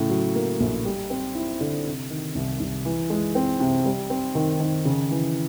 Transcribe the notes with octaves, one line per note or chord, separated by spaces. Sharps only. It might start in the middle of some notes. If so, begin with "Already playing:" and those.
Already playing: A2 C#3
F#3
A#3
A#1
G3
C4
E4
D3
C3
D#3
C2
C2
E3
G#3
C4
C3
G3
C4
D#3
D#3
C#3
E3